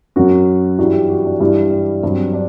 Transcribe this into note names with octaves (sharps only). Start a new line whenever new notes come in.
F#2 F#3 F#4
G2 E3 G3 F#4
G4
F#4
D4
G2 E3 G3 D4
D4
G2 F#3 C4
D4